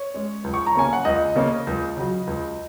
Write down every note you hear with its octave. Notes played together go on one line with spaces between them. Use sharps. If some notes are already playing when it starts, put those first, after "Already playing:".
Already playing: C#5
G#3 C#4
C#2
C#6
A#5
C#3 A#3 C#4 G#5
F#5
C#2 D#5
C#3 A#3 C#4
C#2
C#3 F#3
C#2